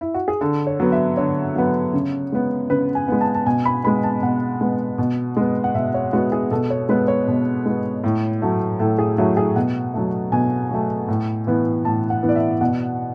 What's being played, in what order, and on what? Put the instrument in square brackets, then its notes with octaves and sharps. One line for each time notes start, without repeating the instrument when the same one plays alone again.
[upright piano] E4
F#4
G#4
D3 A4
C#5
F#3 B3
E5
D3 C#5
F#3 B3
C#3
G#3 B3
C#3 B4
G#5
G#3 B3
A5
A5
B2 G#5
B5
G#3 B3 B5
A5
B2 F#5
G#3 B3
B2
G#3 B3
F#5
B2 E5
C#5
G#3 B3 F#4
G#4
B2 A4
C#5
G#3 B3 B4
C#5
B2
G#3 B3
A2
F#3 A3
A2 A4
G#4
F#3 A3 E4
G#4
B2 F#5
F#3 A3
B2 G#5
F#3 A3
A2
E3 B3
A2 A5
F#5
E3 B3
D5
E5
B2 F#5